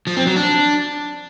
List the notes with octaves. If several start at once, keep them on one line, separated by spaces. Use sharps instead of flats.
F3
C4
F#3
D4